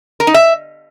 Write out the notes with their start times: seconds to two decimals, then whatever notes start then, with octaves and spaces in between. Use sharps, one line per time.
0.20 A#4
0.27 D#4
0.34 E5